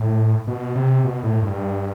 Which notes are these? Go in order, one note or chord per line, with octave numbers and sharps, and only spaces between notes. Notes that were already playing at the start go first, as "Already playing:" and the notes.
Already playing: A2
B2
C3
B2
A2
G2